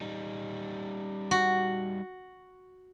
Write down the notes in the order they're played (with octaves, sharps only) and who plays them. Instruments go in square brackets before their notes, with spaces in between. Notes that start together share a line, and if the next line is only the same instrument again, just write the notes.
[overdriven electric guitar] G3 D#4
[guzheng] F#4